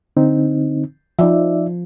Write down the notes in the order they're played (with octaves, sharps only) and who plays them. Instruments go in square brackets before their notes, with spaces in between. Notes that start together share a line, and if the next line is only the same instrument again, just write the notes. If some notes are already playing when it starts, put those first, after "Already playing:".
[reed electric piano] D3 C4 D#4
[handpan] F3 [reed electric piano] D#4 D5 E5